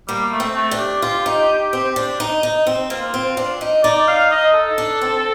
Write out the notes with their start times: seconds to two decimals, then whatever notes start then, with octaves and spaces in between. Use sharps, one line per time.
0.08 G3 A#3
0.32 A3
0.40 C4
0.55 A3
0.71 D4
0.79 G4
1.02 F4
1.26 D#4
1.73 C4
1.96 D4
2.20 D#4
2.43 D#4
2.67 C4
2.90 A#3 F4
3.14 C4
3.37 D4
3.61 D#4
3.84 D#4 D5
4.08 F5
4.31 D#5
4.54 A4
4.78 D4
5.02 C4